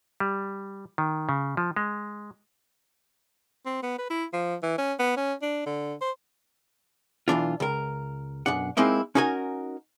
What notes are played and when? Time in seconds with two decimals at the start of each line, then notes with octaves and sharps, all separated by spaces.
0.20 G3
0.98 D#3
1.29 C#3
1.57 F3
1.76 G#3
3.66 C4
3.83 B3
3.98 B4
4.10 E4
4.33 F3
4.63 E3
4.78 C#4
4.99 B3
5.17 C#4
5.42 D4
5.66 D3
6.01 C5
7.28 B1 E3 D4 F4
7.60 C#2 A#4
8.46 B1 F#2 D4 F#5
8.77 G#3 A#3 C4 D#4 E4
9.15 C#4 D#4 F#4 A#4 G#5